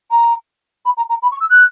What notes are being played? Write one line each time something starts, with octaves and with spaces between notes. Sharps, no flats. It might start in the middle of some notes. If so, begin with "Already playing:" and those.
A#5
B5
A#5
A#5
B5
C#6
E6
F#6